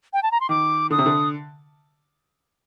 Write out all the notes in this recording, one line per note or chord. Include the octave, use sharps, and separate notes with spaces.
G5
A5
A#5
C6
D#3 D6
D3 D#6
C3
D3